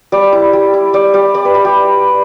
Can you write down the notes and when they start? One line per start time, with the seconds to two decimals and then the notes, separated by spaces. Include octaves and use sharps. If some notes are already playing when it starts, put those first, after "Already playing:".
0.12 G3 D5
0.32 E4
0.53 G3
0.74 E4
0.93 G3 D5
1.14 G3 D5
1.34 G3 D5
1.45 B4
1.54 G3
1.65 G4